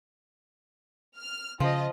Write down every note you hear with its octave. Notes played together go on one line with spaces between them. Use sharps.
F6
C#3 F3 F4 D#5